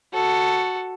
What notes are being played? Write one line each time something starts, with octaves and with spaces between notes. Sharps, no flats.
F#4 A4